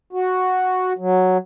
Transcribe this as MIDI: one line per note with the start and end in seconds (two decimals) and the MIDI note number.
0.13 0.93 66
0.99 1.38 54